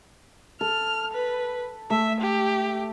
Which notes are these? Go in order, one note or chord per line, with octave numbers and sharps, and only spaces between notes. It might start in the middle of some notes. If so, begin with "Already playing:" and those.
A4 F6
B4
A3 E5
G4